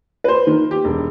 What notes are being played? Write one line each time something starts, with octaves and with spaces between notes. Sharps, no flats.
B4 C5
D#3 A#3
G4
E1